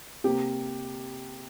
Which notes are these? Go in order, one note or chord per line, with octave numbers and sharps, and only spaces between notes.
C3 A#3 G4